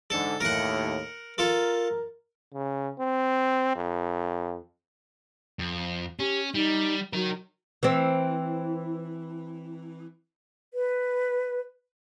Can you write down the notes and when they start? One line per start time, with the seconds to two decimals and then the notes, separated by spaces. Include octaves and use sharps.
0.10 G#2 D3 A4
0.40 D#2 A2 A#4 F#5
1.38 F4 A4 A#4
2.53 C#3
2.99 C4
3.75 F2
5.59 F2
6.19 C#4 G4
6.54 G3 D#4
7.13 F#3 D#4 A#4
7.83 E3 C4
10.74 B4